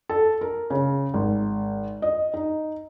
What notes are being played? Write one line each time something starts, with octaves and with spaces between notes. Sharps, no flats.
A4
A#4
C#3
G#1
D#5
D#4